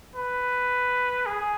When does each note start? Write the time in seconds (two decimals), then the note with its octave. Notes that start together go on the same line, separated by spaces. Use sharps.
0.16 B4
1.26 G#4